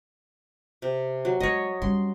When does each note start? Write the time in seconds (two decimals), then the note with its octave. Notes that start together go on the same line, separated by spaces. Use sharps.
0.82 C3
1.25 F#3
1.40 G#3 C4 C#5 D#5
1.82 G3 C#4 C6